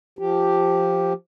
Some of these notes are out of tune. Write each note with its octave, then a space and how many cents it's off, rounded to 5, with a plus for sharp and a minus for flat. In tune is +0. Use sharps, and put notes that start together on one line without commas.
F3 +0 G4 +0